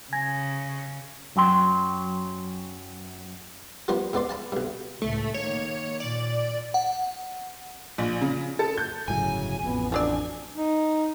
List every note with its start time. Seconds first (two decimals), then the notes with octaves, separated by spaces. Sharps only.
0.13 C#3 G#5 G#6 A#6
1.36 F#2 F#3 G5 C6
3.88 F3 G3 A#3 B3 A#4 C5
4.13 G#2 B3 D5 C6
4.29 F5 A5 B5
4.52 B1 G2
5.02 C#2 A2 A3
5.34 D#3 A#3 C#5
6.00 A#2 D5
6.74 F#5
7.98 A#1
8.21 C#3
8.59 A4
8.78 G6
9.08 G1 A2 C#3 F#3 G#5
9.63 A1 F2 B3
9.92 F3 F#3 D4 D5
10.56 D#4